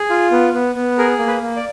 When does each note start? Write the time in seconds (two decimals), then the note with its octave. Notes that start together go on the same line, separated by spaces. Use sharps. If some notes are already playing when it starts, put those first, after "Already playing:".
Already playing: G#4
0.10 F4
0.31 B3
0.54 B3
0.75 B3
0.98 G#4 A#4
1.19 A#3
1.27 B4
1.42 A#3
1.56 D5